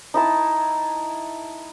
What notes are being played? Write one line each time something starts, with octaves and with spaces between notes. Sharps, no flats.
D#4 E4 A5